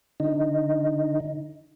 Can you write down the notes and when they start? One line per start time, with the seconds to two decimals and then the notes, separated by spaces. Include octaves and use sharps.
0.20 D3 D#4